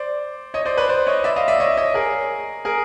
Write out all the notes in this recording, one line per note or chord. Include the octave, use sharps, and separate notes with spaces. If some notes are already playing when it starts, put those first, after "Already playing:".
Already playing: C5 D5
C#5 D#5
C5 D5
B4 C#5
C5 D5
C#5 D#5
D5 E5
D#5 F5
D5 E5
C#5 D#5
C#5 D#5
G#4 A#4
G#4 A#4